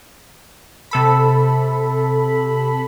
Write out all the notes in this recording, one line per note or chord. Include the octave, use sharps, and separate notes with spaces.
C3 A4 B5